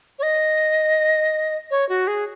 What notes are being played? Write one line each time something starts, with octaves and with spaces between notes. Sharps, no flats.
C#5
D#5
C#5
F#4
G#4